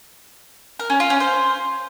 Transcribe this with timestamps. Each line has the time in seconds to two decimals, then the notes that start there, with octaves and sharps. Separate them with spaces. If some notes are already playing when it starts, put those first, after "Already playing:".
0.79 A#4
0.90 C#4
1.00 F4
1.10 C#4
1.20 C5